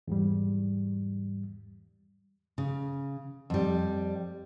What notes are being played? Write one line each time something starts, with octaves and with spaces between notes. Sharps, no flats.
E2 G#2 G3
C#3
F2 G3